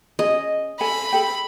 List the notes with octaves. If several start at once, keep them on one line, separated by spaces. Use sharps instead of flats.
C#4 G#4 D#5
A4 G#5 B5
G#4 A4 G5